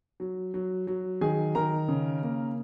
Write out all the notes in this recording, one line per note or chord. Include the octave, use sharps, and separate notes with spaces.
F#3
F#3
F#3
D#3 G#4 G#5
D#3 A#4 A#5
C#3
A#3